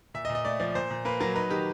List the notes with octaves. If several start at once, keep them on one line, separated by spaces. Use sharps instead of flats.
A#2 E5
D#5
A#2
D#5
A3 D5
F3 D5
A#2 C5
A#2
A#3 B4
F#3 A#4
D#4 B4
D#3 G4